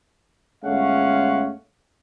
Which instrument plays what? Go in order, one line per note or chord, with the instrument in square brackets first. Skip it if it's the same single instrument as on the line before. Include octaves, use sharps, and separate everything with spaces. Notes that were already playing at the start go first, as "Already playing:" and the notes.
[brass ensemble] G1 G#3 A3 C#4 F5 F#5